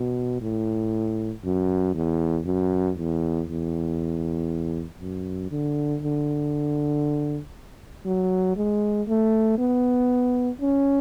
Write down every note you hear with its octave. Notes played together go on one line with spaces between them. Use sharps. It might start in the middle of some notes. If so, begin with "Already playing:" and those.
Already playing: B2
A2
F#2
E2
F#2
E2
E2
F#2
D3
D3
F#3
G#3
A3
B3
C#4